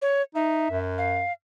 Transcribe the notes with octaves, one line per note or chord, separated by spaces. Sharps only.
C#5
D#4 E5
F#2
F5